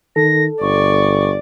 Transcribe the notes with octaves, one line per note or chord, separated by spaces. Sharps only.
D#3 A4 A#6
G1 D5 C#6